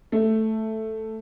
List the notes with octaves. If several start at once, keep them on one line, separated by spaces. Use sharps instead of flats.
A3